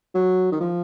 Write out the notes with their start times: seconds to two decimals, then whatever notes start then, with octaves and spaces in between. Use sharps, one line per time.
0.15 F#3
0.52 D#3
0.60 F3